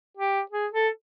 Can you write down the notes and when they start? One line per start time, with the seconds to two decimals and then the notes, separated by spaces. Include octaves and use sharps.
0.17 G4
0.51 G#4
0.73 A4